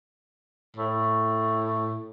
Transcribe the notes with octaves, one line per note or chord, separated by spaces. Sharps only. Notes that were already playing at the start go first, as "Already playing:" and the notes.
A2